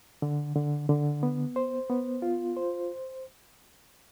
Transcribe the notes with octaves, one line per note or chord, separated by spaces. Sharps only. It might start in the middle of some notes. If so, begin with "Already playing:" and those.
D3
D3
D3
B3
C5
B3
F4
C5